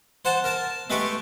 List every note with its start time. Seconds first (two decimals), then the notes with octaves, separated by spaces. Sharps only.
0.25 C5 F#5 A5
0.44 A#4 A5
0.90 G#3 A3 G4 B4 C#6 D6